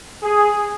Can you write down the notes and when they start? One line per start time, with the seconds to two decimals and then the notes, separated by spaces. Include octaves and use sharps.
0.23 G#4